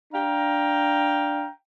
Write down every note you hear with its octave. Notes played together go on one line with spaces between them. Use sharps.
D4 F5 G5 A#5